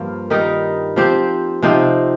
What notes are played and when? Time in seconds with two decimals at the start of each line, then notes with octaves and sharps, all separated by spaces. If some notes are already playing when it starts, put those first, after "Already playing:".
Already playing: G2 F3 A#3 F4
0.30 D#3 G3 D#4 A#4
0.96 F3 C4 G4 C5
1.62 C3 F3 C4 D#4